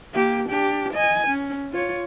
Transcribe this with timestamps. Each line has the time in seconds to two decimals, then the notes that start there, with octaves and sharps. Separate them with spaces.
0.14 A#3 G4
0.49 D4 G4
0.94 D#5 G#5
1.27 C#4
1.72 F4 C#5